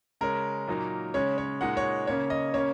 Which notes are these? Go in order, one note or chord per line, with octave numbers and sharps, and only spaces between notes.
C#3 G#3 C#4 A#4
A#2 F#3 A#3 D#4
C#3 G#3 C#4 C#5
C#5
A#2 G#3 D#4 F#5
C#5
C#3 A#3 C#4 C#5
D#5
C#3 A#3 C#4 C#5